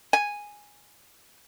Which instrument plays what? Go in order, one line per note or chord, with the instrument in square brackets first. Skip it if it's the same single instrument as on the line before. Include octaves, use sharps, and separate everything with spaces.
[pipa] G#5